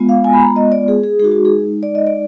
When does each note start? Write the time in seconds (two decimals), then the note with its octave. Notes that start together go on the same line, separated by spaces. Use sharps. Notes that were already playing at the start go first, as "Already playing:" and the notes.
Already playing: G#3 B3 F4
0.09 F5
0.24 G#5
0.33 B5
0.41 A#5
0.56 D#5
0.72 D5
0.88 G#4
1.04 G#4
1.19 G#3 D#4 F#4 G#4
1.32 F#4
1.45 G#4
1.83 D5
1.95 D#5
2.07 D5